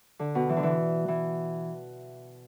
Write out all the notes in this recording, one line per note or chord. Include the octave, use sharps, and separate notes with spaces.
D3
B2
E3
D3
E3
E3